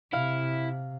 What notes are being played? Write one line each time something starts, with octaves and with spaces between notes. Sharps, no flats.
C3 E4 F5